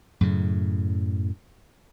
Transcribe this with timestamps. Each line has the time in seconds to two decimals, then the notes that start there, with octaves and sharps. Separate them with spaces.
0.21 F#2 A2 C#3